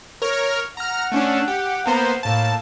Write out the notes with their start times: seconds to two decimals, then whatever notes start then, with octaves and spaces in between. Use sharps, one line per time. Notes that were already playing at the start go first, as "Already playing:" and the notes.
0.22 A#4 C#5 F6
0.77 F#5 A#5 F6
1.12 A3 C#4 D4
1.48 G4
1.86 A#3 B3 C5 A#5
2.23 A2 A#3 A5